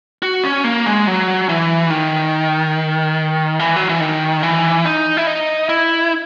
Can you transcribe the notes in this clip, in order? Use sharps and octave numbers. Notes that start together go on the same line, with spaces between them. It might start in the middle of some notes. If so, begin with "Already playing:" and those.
F#4
C#4
A#3
G#3
F#3
E3
D#3
E3
F#3
E3
D#3
E3
D#4
E4
D#4
E4